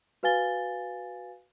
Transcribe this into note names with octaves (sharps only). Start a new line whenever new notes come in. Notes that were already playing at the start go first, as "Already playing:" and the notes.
F#4 B4 F5 G#5 A6 G7